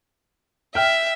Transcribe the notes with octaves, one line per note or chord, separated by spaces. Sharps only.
E5 G5 F6